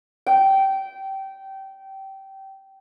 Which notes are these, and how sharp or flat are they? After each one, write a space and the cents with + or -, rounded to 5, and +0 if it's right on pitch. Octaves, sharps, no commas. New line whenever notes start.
G5 -20